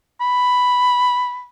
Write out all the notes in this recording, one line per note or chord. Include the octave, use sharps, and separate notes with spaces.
B5